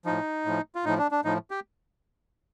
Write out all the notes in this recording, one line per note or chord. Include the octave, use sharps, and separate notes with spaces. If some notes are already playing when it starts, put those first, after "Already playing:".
A2 F3 D#4
A2 F3
F4
A2 F3 D#4
D4
D4
A2 F3 D#4
G4